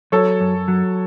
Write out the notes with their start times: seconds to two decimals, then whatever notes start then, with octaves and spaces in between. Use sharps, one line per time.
0.12 F#3 A4 C#5
0.40 F#2
0.68 F#3